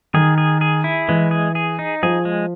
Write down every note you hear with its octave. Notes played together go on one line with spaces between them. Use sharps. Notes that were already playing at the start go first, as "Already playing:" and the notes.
D#3 G#4
G#4
G#4
E4
E3 G#3
G#4
G#4
D#4
F3 G#4
G#3